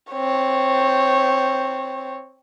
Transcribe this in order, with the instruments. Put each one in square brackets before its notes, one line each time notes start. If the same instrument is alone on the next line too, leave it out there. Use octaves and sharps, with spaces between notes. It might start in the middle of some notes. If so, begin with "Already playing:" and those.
[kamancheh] C4 C#5